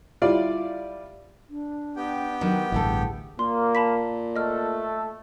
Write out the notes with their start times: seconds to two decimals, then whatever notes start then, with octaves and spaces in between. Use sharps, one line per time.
0.22 G3 E4 F4 D5 F5
1.50 D4
1.96 B3 G4 G5
2.41 D#3 F#3
2.72 A1 D2 G2 E4 G#4 A4
3.39 A#2 A#3 C6
3.75 A5 B5 B6
4.36 A3 A4 D#5 F6